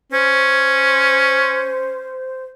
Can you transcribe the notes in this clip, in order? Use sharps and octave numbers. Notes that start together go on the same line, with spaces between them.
C#4 C5